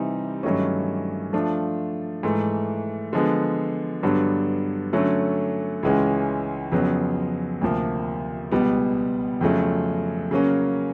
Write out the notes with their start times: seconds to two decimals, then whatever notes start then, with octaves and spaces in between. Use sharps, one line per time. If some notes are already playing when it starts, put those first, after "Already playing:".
Already playing: C3 E3 G3 C4 D#4
0.43 G2 D#3 F#3 A3 C#4
1.33 F3 A3 D4 F4
2.23 G#2 E3 A3
3.13 D3 F3 G#3 B3
4.03 G2 D3 F#3 B3 D4
4.93 D3 F#3 A3 C#4
5.83 C#2 C#3 E3 G#3 C#4
6.72 F2 C#3 F#3 B3
7.61 D2 C3 F3 A#3
8.51 C#2 B2 G3 B3
9.41 F2 C#3 F#3 A3
10.31 C#3 F#3 A#3 C#4